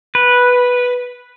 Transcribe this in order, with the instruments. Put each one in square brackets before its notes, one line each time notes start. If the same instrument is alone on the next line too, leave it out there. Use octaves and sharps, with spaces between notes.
[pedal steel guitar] B4